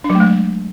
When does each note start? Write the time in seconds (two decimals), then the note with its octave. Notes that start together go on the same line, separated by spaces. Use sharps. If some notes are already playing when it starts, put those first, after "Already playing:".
0.04 D4
0.10 F#3
0.15 A3
0.20 G#3